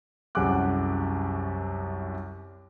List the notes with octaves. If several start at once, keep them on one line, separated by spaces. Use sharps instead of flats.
C2 F#2 G#4 F#5 D6 F#6